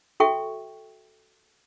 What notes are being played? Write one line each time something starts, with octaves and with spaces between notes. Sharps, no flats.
F#4 A4 E5 G5 C#6